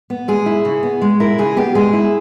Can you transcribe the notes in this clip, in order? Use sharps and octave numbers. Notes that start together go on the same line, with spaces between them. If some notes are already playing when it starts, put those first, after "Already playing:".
B3
G#3 G#4
E4
C#3
B3
G#3
E4 A#4
C#3 G#4
B3 G4
G#3 G#4
E4